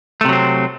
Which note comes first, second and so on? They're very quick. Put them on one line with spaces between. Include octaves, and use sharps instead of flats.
A3 C3 F#3 C4